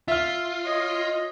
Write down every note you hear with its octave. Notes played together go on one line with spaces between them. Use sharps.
F4 E5 F6
C#5 D#5